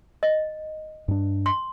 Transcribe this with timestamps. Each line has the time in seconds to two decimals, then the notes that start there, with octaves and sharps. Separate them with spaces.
0.23 D#5
1.08 G2 D4
1.46 C6